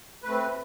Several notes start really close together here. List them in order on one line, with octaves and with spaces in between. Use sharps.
B4 A3 C4